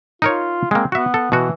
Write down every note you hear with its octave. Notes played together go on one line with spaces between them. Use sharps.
D#4 F4 A#4 C#5
G#3 A#3 C4
B3 F#4 E5
A4
B2 E3 F#4